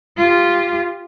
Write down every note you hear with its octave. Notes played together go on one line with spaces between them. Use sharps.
F4 G4